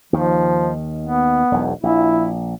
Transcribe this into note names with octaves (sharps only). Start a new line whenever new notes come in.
D#2 D#3 F3
B3
E1 B1 E2
A#1 E4